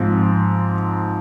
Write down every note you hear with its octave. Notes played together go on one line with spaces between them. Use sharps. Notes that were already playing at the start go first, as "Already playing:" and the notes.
Already playing: G#2 F3 C4